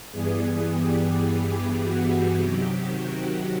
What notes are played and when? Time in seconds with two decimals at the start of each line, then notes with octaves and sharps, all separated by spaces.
0.11 G2 E3 G3 B3 G#4
0.69 G4
1.82 F#4
2.38 C3 D#3 F#3 G4
2.95 F#4